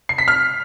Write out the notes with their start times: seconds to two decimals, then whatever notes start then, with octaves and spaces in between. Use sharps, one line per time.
0.09 C7
0.18 B6
0.28 F6